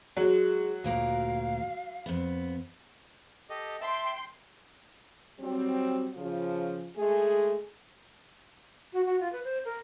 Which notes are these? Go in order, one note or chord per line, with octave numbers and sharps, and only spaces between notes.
F#3 G#3
D2 A#2 A#4 F5
F2 B3
G4 A4 D#5
E5 G5 A5 C6
F#3 G3 C4
C#3 F3
G#3 A3 G#4
F#4
F#4
F4
B4
C5
A#4